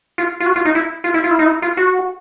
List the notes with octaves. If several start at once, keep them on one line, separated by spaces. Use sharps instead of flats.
F4
F4
F#4
F4
D#4
E4
F4
E4
F4
E4
D#4
E4
F4
F#4